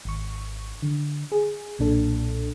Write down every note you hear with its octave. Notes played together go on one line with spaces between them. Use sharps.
G#1 C#6
D3
G#4
B1 A#2 D4 A4